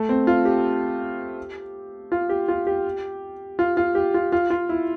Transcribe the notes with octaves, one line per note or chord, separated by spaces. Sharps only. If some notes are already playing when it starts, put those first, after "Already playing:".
Already playing: A3
C4
F4
G4
F4
G4
F4
G4
F4
F4
G4
F4
F4
F4
E4